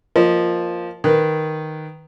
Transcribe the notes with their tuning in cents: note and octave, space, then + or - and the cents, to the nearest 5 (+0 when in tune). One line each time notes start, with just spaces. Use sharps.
F3 +0 A#3 +0 D#5 -15
D#3 +0 B4 +0